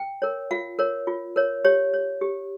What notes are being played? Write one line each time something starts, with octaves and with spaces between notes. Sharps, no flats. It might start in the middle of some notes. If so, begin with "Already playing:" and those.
Already playing: G5
A#4 C#5
F4 F5
A#4 C#5
F4
A#4 C#5
G4 C#5
C#5
G4